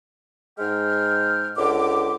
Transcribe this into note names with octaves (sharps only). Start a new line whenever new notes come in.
G#2 G#3 G5 F6
C#2 D3 D6